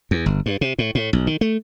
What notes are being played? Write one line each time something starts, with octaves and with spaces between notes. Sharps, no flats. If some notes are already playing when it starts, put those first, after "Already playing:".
E2
G1
G2
C3
A2
A2
B1
D#3
A3